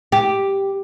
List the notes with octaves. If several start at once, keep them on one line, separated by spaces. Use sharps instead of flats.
G4